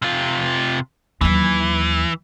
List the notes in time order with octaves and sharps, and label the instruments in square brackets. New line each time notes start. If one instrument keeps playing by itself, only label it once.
[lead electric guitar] C3 F4
[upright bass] D#2 F#3 [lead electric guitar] E3